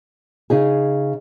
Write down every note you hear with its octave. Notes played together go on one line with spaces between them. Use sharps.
C#3 D#4 G#4